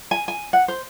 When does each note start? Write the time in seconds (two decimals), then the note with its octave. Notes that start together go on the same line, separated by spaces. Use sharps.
0.11 G#5
0.28 G#5
0.53 F#5
0.68 C5